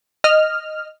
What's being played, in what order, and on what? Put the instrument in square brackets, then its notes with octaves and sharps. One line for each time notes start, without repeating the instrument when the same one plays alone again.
[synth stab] D#5 F6